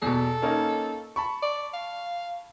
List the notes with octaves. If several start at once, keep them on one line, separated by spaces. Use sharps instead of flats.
E2 B2 A4
A#3 C#4 D#4
A5 B5 C#6
D5
F5